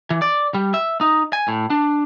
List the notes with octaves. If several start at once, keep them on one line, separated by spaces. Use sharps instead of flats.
E3
D5
G3
E5
D#4
G#5
A2
D4